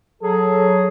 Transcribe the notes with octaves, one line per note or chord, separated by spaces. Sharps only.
F#3 G#4 A4